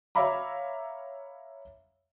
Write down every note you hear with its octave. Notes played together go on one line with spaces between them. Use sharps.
C#5 E5 F5 A#5 B5 D6